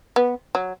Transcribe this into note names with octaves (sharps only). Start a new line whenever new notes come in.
B3
F#3